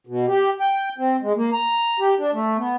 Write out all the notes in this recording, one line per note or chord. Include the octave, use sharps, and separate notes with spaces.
B2
G4
G5
C4
G#3
A#3
A#5
G4
D4
A3
B3